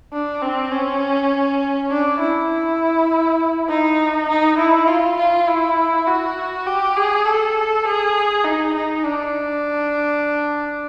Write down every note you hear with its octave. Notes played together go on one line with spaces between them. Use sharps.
D4
C4
C#4
D4
E4
D#4
D#4
E4
F4
F4
E4
F#4
G4
G#4
A4
G#4
D#4
D#4
D4